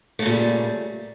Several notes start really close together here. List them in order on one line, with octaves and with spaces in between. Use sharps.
A3 C#3 A#2 G3